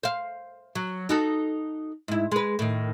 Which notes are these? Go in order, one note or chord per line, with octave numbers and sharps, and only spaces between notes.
C5 F5
F#3
D#4 F#4 A4
G#2 E4
G#3 B4
A2 D#3